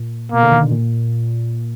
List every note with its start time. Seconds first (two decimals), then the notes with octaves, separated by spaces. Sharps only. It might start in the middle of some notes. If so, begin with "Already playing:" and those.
Already playing: A#2
0.32 B2 A#3
0.42 D3
0.52 D#3
0.62 D3
0.71 A#2